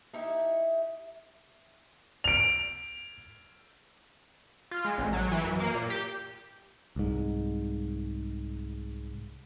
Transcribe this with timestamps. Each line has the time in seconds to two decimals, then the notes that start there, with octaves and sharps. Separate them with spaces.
0.13 D#4 E4 G4 E5
2.24 D7 F7
4.71 F4
4.85 G#3
4.98 A1
5.13 F#3
5.32 E3
5.45 F#2
5.60 A#3
5.74 A#2
5.90 G4
6.96 C2 G#2